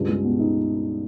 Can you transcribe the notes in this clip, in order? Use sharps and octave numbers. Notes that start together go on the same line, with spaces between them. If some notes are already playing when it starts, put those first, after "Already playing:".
Already playing: C#2 G2
G#3
B2
D#4